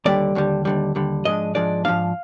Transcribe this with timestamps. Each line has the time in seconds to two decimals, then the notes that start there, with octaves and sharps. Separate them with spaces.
0.05 D#2 D3 G3 D5
0.35 D#2 D3 G3
0.65 D#2 D3 G3
0.95 D#2 D3 G3
1.25 G#2 F3 G#3 D4 D#5
1.55 G#2 F3 G#3 D4 D5
1.85 G#2 F3 G#3 D4 F5